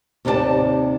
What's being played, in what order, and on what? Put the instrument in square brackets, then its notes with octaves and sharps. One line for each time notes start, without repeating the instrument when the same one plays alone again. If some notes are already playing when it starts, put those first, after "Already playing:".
[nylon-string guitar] D#2 C3 D#4 A#4 D5 A5